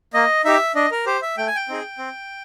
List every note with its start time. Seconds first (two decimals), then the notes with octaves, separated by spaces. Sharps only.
0.14 A#3 D#5
0.45 D#4 G4 E5
0.75 D4 D#5
0.91 A#4
1.06 G4 C5
1.22 E5
1.37 A3 G5
1.47 G#5
1.56 G5
1.69 C4 D#4 G#4
1.98 C4